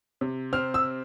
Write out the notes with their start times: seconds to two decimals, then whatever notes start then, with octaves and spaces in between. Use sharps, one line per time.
0.21 C3
0.53 C4 F6
0.74 E6